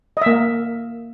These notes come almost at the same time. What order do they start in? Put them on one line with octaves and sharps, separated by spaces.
D#5 E5 A#3